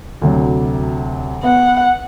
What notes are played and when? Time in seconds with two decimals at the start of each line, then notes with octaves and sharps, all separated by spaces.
0.22 D2 C3 F#3
1.43 B3 F#5